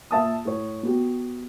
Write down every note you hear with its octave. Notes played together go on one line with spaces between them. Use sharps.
A#2 E5 A5 D#6
A2 C#5
B3 F#4 G4